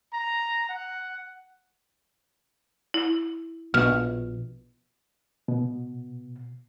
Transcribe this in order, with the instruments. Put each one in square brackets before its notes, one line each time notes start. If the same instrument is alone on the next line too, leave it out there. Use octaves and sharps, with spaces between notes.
[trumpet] A#5
F#5
[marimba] E4
[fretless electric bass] A#1 B2 [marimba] F6
[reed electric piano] B2